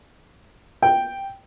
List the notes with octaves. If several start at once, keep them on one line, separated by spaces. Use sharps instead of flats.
G5